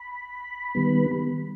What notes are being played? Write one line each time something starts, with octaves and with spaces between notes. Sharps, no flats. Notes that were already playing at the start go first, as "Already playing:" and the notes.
Already playing: B5
D#3 G3 B3